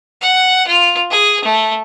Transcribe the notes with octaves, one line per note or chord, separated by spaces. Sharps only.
F#5
F4
G#4
A3